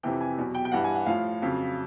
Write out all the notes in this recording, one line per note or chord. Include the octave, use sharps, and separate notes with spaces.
F2 C3 E3 G5
G#5
E2 B2 F#3
G5
G5
G2 E3 F#5
G#5
F#5
A2 F3 F5
F2 C#3 F#3